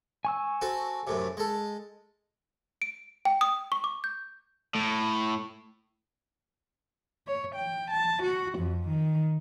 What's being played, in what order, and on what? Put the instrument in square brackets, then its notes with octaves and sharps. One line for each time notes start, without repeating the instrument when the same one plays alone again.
[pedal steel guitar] G#5 C#6 E6
[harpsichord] C4 F#4 A4
F#2 A2 C3
G#3 A4
[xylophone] D7
G5
D#6
C#6
D6
G6
[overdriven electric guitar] A2
[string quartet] C#5
G5
A5
F#4
F2
D#3